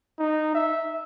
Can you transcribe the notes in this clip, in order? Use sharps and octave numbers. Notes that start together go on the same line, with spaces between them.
D#4
E5